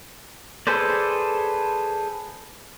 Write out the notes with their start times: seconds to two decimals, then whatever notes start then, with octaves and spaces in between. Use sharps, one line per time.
0.67 G#4 A4 B4 C5 D5